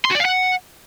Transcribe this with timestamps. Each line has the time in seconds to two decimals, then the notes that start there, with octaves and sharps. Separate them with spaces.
0.05 C6
0.10 F#4
0.15 D5
0.20 F5
0.25 F#5